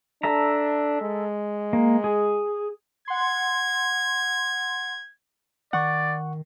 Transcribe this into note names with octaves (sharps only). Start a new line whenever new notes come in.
D4 A4 E5 A#5
G#3
A#3
G#4
F#5 C6 G#6
D#3 D5 F#5 C#6